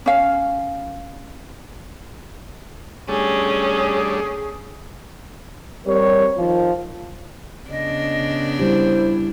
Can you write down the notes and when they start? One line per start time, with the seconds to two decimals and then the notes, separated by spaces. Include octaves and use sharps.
0.06 C#4 F5
3.09 G3 A3 C#4 D4 G#4
5.86 G3 C4 G4 A#4 C#5
6.37 D#3 F3 F4
7.70 C#3 B3 D4 D#5
8.59 G3 E4 G4 C5